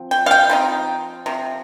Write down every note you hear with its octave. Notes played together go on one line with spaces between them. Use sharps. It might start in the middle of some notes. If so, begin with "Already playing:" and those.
Already playing: F3 C4
G5
F5
G5
F3 C4 D#4
C3 F3